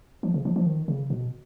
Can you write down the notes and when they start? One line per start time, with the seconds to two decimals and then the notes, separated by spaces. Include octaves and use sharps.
0.23 F3
0.34 C#3
0.45 F3
0.56 F3
0.67 D#3
0.88 C#3
1.10 B2